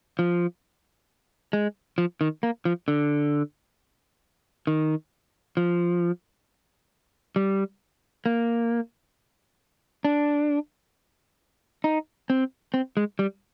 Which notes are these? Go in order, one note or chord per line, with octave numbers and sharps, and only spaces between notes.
F3
G#3
F3
D#3
A#3
F3
D3
D#3
F3
G3
A#3
D4
D#4
C4
C4
G#3
G3